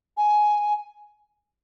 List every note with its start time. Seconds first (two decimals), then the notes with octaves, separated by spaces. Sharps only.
0.17 G#5